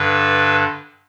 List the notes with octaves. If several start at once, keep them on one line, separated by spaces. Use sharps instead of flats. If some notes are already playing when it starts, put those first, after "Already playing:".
Already playing: G2 D3 B4